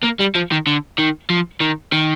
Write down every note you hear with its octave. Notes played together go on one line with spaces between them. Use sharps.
A#3
G3
F3
D#3
D3
D#3
F3
D#3
D#3